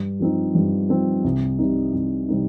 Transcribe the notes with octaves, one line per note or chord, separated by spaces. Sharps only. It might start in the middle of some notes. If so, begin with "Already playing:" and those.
Already playing: G2
F3 C4 D#4
G2
F3 C4 D#4
C2
C3 G3 C4 D#4
C2
C3 G3 C4 D#4